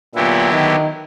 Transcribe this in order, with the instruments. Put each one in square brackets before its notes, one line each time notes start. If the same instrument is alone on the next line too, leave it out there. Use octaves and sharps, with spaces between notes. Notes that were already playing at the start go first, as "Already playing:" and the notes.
[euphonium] A#2 [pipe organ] D3 F#3 B3 E4 G4
[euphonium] D#3